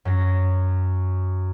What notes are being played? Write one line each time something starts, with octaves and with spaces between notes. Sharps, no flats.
F#2 A#6